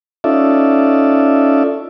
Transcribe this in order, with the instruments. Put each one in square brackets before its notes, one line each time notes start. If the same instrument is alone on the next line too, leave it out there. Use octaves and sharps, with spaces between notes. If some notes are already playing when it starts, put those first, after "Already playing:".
[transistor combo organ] C#4 D#4 F4 A4 D5 E5